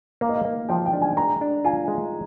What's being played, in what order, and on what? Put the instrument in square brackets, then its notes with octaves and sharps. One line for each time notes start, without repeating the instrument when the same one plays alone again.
[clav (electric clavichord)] A#3 [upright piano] F5
[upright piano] D#5
F5
[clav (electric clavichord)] A#3
[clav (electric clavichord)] F3 [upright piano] G5
[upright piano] G5
[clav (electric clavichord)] D4
[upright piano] G#5
[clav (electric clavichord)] G#3 [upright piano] A#5
[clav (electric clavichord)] D4
[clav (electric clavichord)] F4 [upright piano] G#5
[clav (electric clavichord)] G#3